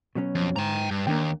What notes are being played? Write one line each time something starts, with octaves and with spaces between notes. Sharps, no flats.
B2 F#3 C#4
F2
G#2 G5 A#5
G2
D#2 A#3 D4 G5